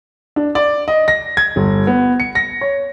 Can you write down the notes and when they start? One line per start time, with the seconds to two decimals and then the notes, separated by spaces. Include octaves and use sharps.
0.36 D4
0.55 D5
0.88 D#5
1.08 A#6
1.37 G#6
1.56 G1
1.87 B3
2.20 C#7
2.35 A#6
2.61 C#5